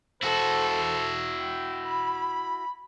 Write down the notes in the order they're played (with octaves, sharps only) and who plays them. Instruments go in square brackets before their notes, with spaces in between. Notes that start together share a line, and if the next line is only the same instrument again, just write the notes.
[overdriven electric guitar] E4 F#4 [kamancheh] A4 C5
[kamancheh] G5
B5